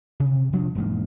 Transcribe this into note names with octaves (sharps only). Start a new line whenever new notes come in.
C3
E1 F3 D4
E1 G#2 A#3